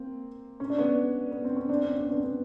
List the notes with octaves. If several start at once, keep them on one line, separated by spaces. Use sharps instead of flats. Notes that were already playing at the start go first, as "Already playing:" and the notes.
Already playing: A#3 C4
C#4
D4
B3 C#4
B3
C4
C#4
C4 D4
B3 C#4
B3 C#4
C4 D4
B3 C#4